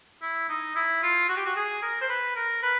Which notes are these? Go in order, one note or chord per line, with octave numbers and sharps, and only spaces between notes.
E4
D#4
E4
F4
F#4
G4
F#4
G#4
A#4
C5
B4
A#4
B4